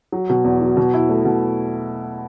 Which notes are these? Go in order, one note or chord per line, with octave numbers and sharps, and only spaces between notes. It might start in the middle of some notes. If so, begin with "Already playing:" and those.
F#3
B2
E2
F#3
B2
E4
A3
B2